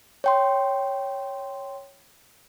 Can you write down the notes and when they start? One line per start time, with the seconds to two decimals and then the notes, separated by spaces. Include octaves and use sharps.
0.24 C#5 G5 C6